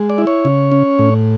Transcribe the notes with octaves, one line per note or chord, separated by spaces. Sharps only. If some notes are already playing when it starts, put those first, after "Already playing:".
Already playing: G#3
D5
E4
C#5
C#3
C#4
A2